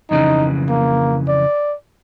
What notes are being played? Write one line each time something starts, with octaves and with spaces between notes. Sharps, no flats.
F2 C#3 E3 D#4
A#3
D5